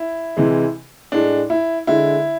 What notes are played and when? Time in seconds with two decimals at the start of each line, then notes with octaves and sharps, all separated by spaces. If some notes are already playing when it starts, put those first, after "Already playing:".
Already playing: E4
0.37 C3 E3 G#3
1.12 A2 G#3 D4
1.50 E4
1.87 D3 G#3 E4